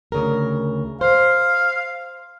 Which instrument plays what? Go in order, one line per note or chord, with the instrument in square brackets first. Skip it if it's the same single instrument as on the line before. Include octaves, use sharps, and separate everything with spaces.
[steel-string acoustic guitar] D2 C#3 A#4
[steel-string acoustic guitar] C5 [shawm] F5